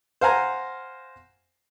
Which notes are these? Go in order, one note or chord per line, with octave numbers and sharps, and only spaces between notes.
C5 F5 F#5 G#5 A#5